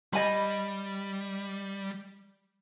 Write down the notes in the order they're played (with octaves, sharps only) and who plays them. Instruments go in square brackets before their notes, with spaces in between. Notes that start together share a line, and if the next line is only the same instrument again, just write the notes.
[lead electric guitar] G3 [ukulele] D#5 G#5 B5